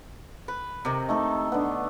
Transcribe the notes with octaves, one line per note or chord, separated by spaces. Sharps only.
B4
C3 D#3
A3 D#4 A4
D3 B3